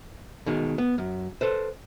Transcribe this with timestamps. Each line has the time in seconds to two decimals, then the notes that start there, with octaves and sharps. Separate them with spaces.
0.46 B2 D#3 G#3
0.78 B3
0.98 F#2
1.41 A4 B4 C5